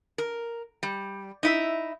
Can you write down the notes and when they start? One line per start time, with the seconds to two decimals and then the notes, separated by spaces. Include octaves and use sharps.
0.18 A#4
0.83 G3
1.43 D#4 E4 E5